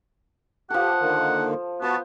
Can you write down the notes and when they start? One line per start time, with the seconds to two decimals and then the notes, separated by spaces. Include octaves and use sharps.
0.70 F3 G4 A4 F#5
1.01 D3 D#3 A#3
1.82 B3 F#4 C5 A5